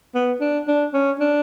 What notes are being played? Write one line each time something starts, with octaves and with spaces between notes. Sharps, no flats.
B3
D4
D4
C#4
D4